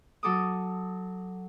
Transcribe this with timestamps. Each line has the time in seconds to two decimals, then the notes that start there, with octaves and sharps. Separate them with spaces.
0.23 F#3 A4 D6 D#6